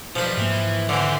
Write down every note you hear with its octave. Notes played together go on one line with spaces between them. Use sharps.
B1 F3 G3 B4
G#2 E3 A#3
D3 E3 C#4 C5